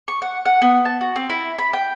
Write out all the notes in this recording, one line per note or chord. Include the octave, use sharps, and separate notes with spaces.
C#6
F#5
F#5
B3
A5
F#4
C4
E4
B5
G5